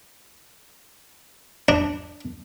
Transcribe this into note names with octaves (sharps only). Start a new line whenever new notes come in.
D4